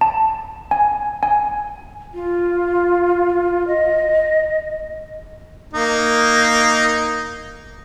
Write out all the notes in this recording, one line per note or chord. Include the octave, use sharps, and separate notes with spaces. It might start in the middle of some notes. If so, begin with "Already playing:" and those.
A5
G#5
G#5
F4
D#5
A#3 D#4